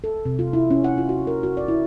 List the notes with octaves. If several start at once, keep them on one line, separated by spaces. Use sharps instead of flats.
A4
C3
F4
E4
C#4
F#5
F4
F#4
A#4
F#4
D5
E4